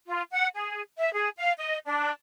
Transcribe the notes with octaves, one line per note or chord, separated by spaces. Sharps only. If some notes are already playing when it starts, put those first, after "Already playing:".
F4
F#5
G#4
E5
G#4
F5
D#5
D4